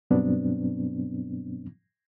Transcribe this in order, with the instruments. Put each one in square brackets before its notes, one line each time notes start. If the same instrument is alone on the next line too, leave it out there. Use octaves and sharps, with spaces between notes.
[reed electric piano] G2 B2 F#3 B3 C4 D4